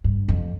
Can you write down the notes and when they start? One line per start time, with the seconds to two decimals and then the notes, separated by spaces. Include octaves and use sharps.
0.04 G2
0.28 F2